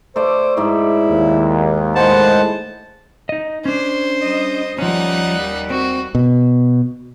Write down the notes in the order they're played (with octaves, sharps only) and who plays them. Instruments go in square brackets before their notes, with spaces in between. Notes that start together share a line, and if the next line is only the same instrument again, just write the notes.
[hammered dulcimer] A3 D5 [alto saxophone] C5
[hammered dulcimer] G#2 D5 [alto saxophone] E4
[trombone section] D#2
[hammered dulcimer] A2 [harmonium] G#3 C5 F#5 [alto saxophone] A5
[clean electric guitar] D#4 D#5
[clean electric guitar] C#4 D4 [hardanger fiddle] C5
[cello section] G3 D#5
[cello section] D#2 G3 [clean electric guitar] F3 C#4 [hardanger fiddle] D#4 F#5
[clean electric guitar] C4 [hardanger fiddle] F#4
[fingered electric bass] B2